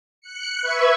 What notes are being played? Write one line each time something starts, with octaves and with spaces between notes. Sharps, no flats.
F#6 C#7
B4 E5 C#6 E6 G#6